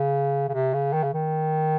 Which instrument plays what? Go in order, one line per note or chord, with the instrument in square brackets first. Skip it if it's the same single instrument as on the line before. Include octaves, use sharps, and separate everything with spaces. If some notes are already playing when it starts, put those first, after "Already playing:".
Already playing: [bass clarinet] C#3
C#3
C3
C#3
D#3
C#3
D#3